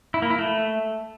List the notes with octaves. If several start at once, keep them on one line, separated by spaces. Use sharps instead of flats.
E4
A#3
E4
A3